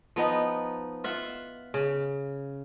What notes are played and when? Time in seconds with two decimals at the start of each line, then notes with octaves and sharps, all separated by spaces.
0.16 F3 B3 D#4
1.04 F4 E5 F#5
1.74 C#3